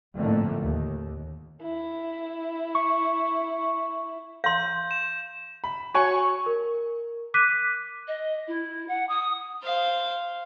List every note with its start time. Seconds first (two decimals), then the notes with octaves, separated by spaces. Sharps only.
0.17 F2 A2 D3 A3 A#3
0.64 D#2
1.62 E4
2.75 C#6
4.44 F5 C6 G6
4.91 E7
5.64 B5
5.94 F#4 C#5 G#5 C#6
6.46 A#4
7.34 D6 F#6 B6 D#7
8.07 D#5
8.47 E4
8.88 F#5
9.08 D#6
9.63 C5 F5